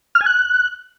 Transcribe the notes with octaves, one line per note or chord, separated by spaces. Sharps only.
F6
G#5
F#6